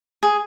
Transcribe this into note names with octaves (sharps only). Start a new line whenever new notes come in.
G#4